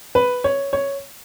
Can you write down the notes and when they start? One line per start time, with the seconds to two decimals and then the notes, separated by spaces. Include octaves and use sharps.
0.15 B4
0.44 C#5
0.73 C#5